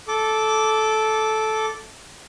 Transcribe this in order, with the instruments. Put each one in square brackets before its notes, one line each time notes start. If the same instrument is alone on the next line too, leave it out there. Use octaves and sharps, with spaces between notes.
[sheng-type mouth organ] A4 D6